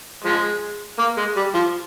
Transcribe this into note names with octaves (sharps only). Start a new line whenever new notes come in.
F3 G#3
A#3
G#3
G3
F3